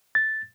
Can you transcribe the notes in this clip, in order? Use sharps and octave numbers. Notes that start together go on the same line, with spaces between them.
A6